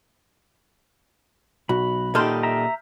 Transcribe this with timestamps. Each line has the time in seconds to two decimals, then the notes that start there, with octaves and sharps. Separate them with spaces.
1.69 B1 F#4 B5
2.15 A#2 D#4 G4 A4 C6 F6 G6
2.43 E5 A#5